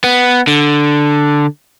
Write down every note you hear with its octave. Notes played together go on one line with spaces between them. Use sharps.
B3
D3